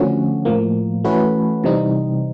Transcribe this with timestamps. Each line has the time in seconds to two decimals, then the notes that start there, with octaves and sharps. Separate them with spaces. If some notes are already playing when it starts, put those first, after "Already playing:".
Already playing: D3 F3 A3 C#4 F#4
0.45 A2 F3 A#3
1.04 E3 A3 C#4 F#4 B4
1.64 C3 E3 G3 C4 D#4